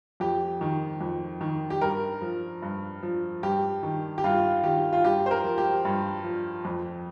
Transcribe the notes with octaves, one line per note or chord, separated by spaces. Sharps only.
F2 G4
D#3
F2
D#3
G4
G2 A#4
F3
G2
F3
G2 G4
D#3
G4
G2 F4
D#3 G4
F4
G2 G4
C5
A#4
F3
G4
G2
F3
F2